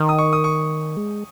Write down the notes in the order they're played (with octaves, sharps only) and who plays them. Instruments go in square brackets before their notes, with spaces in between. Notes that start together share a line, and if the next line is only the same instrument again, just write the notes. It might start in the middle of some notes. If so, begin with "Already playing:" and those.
Already playing: [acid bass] D#3
[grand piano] D#6
C#6
D#6
C#6
[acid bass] G#3